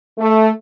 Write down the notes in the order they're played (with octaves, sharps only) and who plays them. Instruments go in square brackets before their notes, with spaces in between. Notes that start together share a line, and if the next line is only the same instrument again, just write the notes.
[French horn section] A3